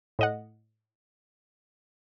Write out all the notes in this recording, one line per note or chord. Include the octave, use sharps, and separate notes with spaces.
A2 D#5 F#5